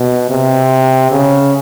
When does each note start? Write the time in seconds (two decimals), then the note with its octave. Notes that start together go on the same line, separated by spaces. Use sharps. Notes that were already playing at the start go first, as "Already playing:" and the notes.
Already playing: B2
0.30 C3
1.11 C#3